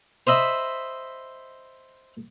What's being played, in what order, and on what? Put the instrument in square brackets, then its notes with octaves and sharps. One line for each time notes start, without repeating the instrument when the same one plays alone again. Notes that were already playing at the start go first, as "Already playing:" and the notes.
[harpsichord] C5 D#5 E5 B5